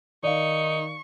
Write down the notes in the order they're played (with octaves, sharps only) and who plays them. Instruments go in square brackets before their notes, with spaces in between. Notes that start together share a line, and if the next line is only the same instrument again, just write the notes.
[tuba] D#3 [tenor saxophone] D#4 [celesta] D5 F5 [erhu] C#6